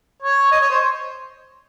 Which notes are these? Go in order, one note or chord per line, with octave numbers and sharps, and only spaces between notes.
C#5
D#5
C#5
C5